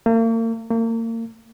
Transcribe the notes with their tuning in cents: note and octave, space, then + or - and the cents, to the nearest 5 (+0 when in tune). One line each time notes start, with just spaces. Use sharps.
A#3 -40
A#3 -35